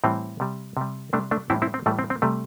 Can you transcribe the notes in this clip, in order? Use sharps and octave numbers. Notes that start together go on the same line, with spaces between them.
A2 E3 G3 C4
C3 G3
C3 G3
C3 G3 A3 D4
A3 D4
A2 E3 G3 C4 E4
C4 E4
C4
A2 E3 G3 A3
C4
C4
C3 G3 A3